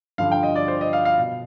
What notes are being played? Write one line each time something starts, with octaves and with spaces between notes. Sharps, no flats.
G2 D3 F3 F5
G5
D#5
D5
C5
D#5
F5
F5
B2